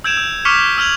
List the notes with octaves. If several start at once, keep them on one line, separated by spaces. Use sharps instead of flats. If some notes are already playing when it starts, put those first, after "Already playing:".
E6 G6 G#6 D7 E7 F7
E6
C#6 D6 F6 B6 C#7 F7
E6 F6 G#6 F7 F#7